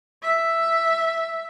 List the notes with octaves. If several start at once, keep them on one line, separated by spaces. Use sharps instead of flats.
E5